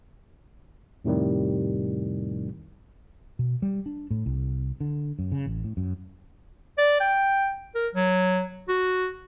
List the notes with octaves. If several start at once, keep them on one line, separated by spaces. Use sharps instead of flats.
F2 A2 C3 D#3 G3
B2
G3
D4
A2
C2
D3
F#2
C#3
A1
A2
F#2
D5
G5
A#4
F#3
F#4